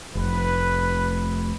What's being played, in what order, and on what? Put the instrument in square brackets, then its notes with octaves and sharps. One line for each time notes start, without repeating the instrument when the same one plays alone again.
[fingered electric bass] F1 [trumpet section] B4